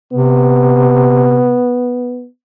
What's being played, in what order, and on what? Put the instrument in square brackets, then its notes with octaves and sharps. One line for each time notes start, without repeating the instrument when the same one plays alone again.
[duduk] C3 [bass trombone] B3